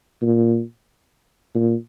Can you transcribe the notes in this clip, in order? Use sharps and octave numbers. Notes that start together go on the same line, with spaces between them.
A#2
A#2